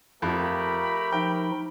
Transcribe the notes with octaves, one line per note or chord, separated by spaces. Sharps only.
F2 F3 A3 G4 A#4 B5
F3 D#4 G5